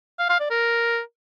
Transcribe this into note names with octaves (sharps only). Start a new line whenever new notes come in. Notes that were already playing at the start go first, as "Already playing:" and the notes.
F5
F5
D5
A#4